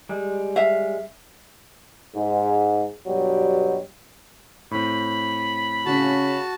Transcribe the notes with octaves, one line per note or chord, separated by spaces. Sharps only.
G3 G#3
E5 F5
G#2
G2 B2 F#3 G3
A2 C4 B5
C#3 F#4 A5